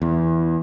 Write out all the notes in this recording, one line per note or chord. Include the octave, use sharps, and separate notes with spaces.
E2